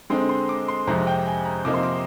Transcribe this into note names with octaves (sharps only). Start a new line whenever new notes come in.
D3 G#3 C4 D#4 C6
C6
D6
C6
F2 C3 F3 G#3 D#4 A#5
G5
G#5
A#5
C3 F3 A#3 D#4 D6
C6
D6